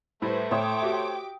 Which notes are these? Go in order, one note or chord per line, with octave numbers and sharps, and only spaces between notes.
A2 G3 A3 E4 B4 C5
A2 C5 C#5 G5 D6 D#6
F#4 G4 E5